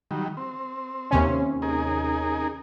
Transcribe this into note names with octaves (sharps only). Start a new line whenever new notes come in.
D#3 F#3 G3
C4
D#2 C3 C#4
D#4 G#4 A#4